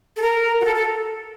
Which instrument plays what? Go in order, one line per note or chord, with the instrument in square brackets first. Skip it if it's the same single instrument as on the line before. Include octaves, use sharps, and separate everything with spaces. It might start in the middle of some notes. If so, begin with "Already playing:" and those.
[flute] A4
A#4
F#4
A4
A4